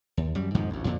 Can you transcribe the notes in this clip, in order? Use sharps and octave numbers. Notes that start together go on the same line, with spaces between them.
D#2
F#2 G3
F2 G#2 D#3 F3
A1 D2
F2 A#2 D3